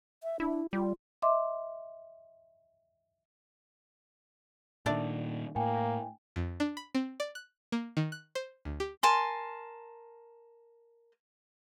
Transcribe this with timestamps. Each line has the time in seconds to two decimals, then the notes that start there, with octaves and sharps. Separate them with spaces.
0.23 E5
0.40 D4 E4
0.73 G3 F4
1.22 D#5 E5 C6 D6
4.86 A#2 D#3 A3 D4 D5
5.56 A2 A#3 G5 G#5
6.36 F2
6.60 D4
6.77 B5
6.95 C4
7.20 D5
7.35 F#6
7.72 A#3
7.97 D#3
8.12 F#6
8.35 C5
8.65 D2
8.80 G4
9.03 A#4 G#5 A5 C6